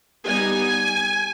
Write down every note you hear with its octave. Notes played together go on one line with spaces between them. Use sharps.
G3 B3 D#4 G#5